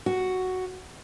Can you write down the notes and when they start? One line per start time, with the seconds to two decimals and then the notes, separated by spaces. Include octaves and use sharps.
0.06 F#4